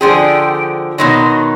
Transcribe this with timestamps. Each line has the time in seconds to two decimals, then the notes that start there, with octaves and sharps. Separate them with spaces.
0.01 D3 F3 G#4 G5
0.98 B2 D#3 F#3 C6